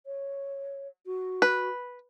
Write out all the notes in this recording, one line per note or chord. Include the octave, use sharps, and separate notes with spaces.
C#5
F#4
B4